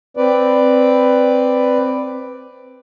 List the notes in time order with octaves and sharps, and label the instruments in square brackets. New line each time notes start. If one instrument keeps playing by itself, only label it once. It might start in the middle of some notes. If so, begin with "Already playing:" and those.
[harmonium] C4 B4 D5